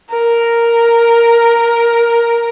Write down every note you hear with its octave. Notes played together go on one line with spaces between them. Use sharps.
A#4